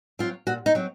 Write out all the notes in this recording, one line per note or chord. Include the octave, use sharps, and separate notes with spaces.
F#3 C4 F4
A#2 F#4
D#4
F#3 C4